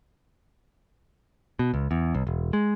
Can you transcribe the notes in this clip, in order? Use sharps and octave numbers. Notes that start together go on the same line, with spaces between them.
B2
C#2
E2
C2
E1
G#3